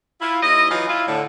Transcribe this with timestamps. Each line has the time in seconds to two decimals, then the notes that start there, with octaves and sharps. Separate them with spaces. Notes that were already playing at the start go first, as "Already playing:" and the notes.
0.21 E4 F4
0.43 D#2 E4 D#5
0.70 E3 F#3 D#4 F4
0.88 E4 F4
1.07 A2 D3